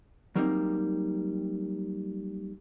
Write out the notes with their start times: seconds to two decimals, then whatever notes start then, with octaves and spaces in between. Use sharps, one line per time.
0.36 F#3 G3 A#3 C4 D#4